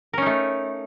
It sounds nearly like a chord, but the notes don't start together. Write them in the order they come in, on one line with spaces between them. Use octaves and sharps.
A#4 C#4 D#4 A3